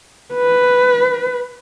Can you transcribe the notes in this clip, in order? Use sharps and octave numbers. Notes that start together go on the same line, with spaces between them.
B4